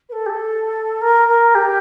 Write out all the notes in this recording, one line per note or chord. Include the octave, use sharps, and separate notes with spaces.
B4
A4
G4
A4
A#4
A#4
G4